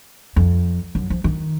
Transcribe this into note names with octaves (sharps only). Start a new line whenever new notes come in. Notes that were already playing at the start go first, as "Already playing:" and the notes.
F2
F#2
F3
D#3